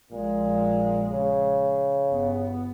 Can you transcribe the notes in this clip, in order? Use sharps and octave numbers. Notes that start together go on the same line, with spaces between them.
A#1 A#2 G#3
C#3
G1 B3